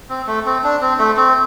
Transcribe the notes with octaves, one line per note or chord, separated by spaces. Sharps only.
C4
A3
C4
D4
C4
A3
C4